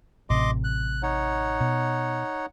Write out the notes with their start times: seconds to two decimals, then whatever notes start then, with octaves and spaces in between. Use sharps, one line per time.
0.30 A1 A2 C3 D#5 C6 D6
0.64 F#6
1.03 D#4 C#5 F#5
1.61 B2